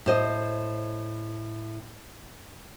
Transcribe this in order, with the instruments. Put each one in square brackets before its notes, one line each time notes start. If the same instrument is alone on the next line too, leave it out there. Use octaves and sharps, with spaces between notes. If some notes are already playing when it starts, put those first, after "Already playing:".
[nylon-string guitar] A2 C5 D#5